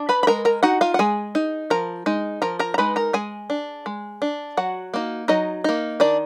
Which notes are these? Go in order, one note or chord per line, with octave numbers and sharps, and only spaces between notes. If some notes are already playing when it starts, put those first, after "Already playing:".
Already playing: D4
B4 B5
B5
G#3 A#4 A#5
A#4 A#5
D#4 F#4 F#5
F4 F5
F#5
G#3 G#4 G#5
D#4
F3 A#4 A#5
G#3 D#4
F3 A#4 A#5
A#4 A#5
A#5
G#3 D#4 B4 B5
A#4 A#5
G#3 G#4 G#5
D4
G#3
D4
F#3 F#4 F#5
A#3 D#4
F#3 D#4 D#5
A#3 D#4
D#3 D4 D5